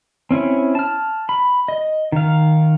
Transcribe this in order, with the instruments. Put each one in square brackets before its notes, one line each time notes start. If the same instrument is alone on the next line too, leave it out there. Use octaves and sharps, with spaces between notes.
[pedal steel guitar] C4 C#4 E4
A5 F6
B5
D#5
D#3 F5